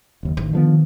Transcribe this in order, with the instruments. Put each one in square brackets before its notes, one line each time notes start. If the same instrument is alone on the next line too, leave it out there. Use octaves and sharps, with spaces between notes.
[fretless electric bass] F#1 D#2
[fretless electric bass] A1 [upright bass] D#3
[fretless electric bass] D3 F3 B3